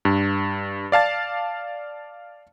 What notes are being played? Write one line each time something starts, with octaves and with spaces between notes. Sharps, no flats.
G2
D5 F5 A5 A6